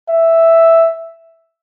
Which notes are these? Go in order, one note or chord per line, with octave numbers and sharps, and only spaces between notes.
E5